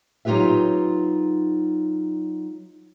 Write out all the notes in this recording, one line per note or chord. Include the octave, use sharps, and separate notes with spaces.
F#3 D#4 F4 G4 B4 E5